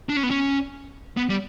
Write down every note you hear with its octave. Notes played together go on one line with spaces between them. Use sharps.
D4
C#4
B3
C#4
B3
G3